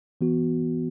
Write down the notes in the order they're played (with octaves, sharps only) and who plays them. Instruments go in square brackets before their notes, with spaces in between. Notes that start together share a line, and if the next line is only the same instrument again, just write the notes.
[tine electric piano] E3 B3 F#4